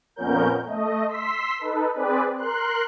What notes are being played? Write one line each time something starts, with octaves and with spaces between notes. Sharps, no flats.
F2 A#2 B3 C#4 A#4 G6
A3 D#5
C6 E6 B6
D#4 A4 B4
C4 G#4 B4 D5
A#4 C6 F#6